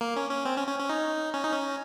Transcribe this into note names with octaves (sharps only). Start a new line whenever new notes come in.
A#3
C#4
C#4
C4
C#4
C#4
C#4
D#4
C#4
D#4
C#4